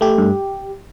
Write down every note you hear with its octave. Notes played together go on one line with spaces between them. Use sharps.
A3 G4
G2